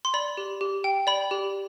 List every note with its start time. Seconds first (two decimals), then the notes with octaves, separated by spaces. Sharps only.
0.05 C6
0.14 D5 B5
0.37 G4
0.61 G4
0.84 G5
1.07 D5 B5
1.31 G4